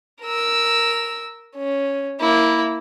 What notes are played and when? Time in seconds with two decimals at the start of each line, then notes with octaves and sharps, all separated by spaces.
0.22 A#4 E6
1.57 C#4
2.20 A#3 E4